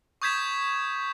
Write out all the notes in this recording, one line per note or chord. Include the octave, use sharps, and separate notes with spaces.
C#6 D#6 G6 G#6 B6 E7